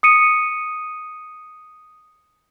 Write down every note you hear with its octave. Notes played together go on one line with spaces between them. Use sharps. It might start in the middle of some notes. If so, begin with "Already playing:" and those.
D#6 C#7 D#7